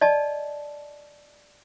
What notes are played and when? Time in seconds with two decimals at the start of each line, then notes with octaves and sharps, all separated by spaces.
0.01 D5 D#5 A5